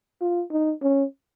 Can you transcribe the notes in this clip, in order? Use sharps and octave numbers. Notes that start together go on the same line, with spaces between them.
F4
D#4
C#4